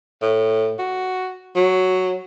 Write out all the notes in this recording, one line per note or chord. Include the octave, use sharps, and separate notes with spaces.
A2
F#4
F#3